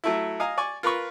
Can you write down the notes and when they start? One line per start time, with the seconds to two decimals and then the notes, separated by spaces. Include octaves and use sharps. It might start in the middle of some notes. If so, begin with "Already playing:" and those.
0.04 F#3 A3 E4
0.40 D#5 F5 G#5 A#5
0.58 D5 G#5 C#6
0.83 F4 A#4 B4 B5 C#6